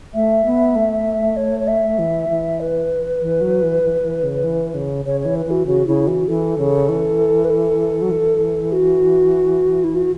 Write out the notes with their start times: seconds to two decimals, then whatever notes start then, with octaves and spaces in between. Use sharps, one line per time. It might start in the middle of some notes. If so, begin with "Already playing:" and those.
0.14 A3 E5
0.46 B3
0.76 A3
1.37 C#5
1.60 C#5
1.68 E5
1.99 E3
2.29 E3
2.60 B4
3.21 E3
3.41 F#3
3.62 E3
3.83 E3
4.02 E3
4.23 C#3
4.44 E3
4.74 C#3
5.05 C#3 C#5
5.20 C#5
5.25 E3
5.35 B4
5.46 E3 F#4
5.66 C#3 F#4
5.87 C#3 E4
6.07 E3 F#4
6.28 E3 A4
6.58 C#3
6.89 E3
7.44 B4
7.50 A4
8.02 F#3
8.11 E3
8.72 F#4
9.84 E4
9.95 F#4